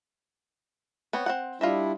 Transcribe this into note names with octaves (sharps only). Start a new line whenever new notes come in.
B3 C4 C#5
C4 D#4 F#5
G3 D4 E4 F4 D#5 E5